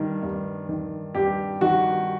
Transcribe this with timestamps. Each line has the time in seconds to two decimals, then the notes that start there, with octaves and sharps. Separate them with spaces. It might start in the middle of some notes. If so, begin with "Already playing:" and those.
Already playing: G2 D#3
0.23 G2
0.69 D#3
1.15 G2 G4
1.61 D#3 F#4